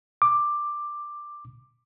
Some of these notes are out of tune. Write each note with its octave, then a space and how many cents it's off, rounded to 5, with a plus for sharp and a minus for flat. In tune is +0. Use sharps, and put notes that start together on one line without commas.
D6 +10